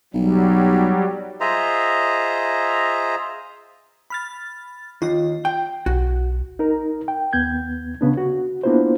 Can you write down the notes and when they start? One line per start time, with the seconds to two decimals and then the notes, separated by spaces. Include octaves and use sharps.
0.14 B1 F#3 G3
1.41 F4 G#4 C5 D#5 E5 A#5
4.10 B5 F6 A6
5.02 D#2 F4 D#5
5.45 G5
5.86 B1 F#4
6.59 D#4 A#4
7.08 G5
7.33 D#2 B3 G6 G#6
8.01 C#3 B3 D4
8.17 F#4
8.64 A#3 B3 D4 E4 F4 C5